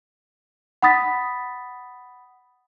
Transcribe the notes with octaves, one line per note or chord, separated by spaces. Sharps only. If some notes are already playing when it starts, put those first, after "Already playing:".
F#5 B5 D#6 A6 B6